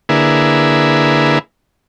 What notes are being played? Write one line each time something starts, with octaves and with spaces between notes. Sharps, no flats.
D3 A#3 E4 G#4 B4